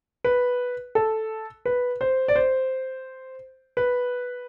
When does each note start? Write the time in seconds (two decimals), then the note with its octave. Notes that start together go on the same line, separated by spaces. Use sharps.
0.24 B4
0.95 A4
1.65 B4
2.01 C5
2.28 D5
2.36 C5
3.77 B4